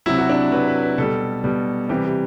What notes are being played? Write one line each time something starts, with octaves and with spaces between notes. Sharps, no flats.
C3 F#3 E4
F#4
D4
C3 F#3 B4
B4
B4
B2 G3 A4
B2 G3
C3 E3 G3 G4
G4